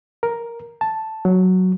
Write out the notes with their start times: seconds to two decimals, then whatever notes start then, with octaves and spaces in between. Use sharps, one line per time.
0.23 A#4
0.81 A5
1.25 F#3